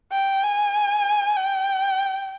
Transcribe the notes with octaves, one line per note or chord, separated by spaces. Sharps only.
G5
G#5
G5